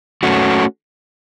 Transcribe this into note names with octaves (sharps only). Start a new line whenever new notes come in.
A3 C#4 F#4